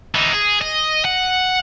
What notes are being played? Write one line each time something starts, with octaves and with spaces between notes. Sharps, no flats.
E3 D#4
G#4
D#5
F#5